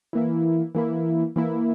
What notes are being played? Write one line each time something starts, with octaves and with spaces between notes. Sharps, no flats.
E3 A#3 E4
E3 A#3 E4
E3 A#3 E4